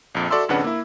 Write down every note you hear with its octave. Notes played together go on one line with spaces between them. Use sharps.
A#1 F2
F#4 A4 D5 E5 C6 E6
G#1 F2 C#3 D4 B4 F#5
A#3 E4